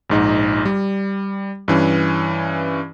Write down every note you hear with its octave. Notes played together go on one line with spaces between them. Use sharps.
A#1 G#2 D#4
G3
G2 E3 C#4